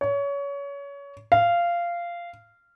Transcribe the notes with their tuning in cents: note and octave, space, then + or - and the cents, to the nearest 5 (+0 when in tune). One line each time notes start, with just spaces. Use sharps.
C#5 +25
F5 -15